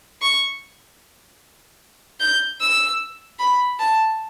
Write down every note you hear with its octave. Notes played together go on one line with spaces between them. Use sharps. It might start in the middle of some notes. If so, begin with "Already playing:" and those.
C#6
G6
E6
B5
A5